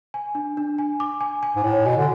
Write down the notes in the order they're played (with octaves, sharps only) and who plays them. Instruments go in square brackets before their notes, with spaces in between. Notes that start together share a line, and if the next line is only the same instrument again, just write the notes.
[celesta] G#5
D4
D4
G#5
D6
G#5
G#5
[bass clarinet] G#2
[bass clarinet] A2 [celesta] C#5
[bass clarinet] B2 [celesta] G#5
[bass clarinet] D3